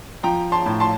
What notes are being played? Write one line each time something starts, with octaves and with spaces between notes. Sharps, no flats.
F3 G5 A#5
A5 C6
A2
A5 C6